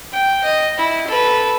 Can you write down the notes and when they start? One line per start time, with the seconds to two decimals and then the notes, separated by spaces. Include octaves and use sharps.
0.12 G5
0.44 D#5
0.77 E4
1.07 A4 B4